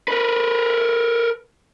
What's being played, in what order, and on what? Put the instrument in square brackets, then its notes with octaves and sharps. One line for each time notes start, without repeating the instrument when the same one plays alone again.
[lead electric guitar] A#4 B4